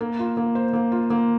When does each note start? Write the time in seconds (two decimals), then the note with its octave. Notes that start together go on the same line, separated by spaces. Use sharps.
0.01 A#3
0.19 F4
0.37 A#3
0.55 C5
0.73 A#3
0.92 F4
1.10 A#3